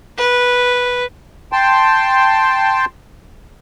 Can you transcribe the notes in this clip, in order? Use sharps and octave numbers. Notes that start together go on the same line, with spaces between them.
B4
G5 A5 C6